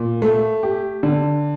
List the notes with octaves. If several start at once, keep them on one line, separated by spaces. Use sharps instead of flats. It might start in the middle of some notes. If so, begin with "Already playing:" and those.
Already playing: A#2
A3
G4
D3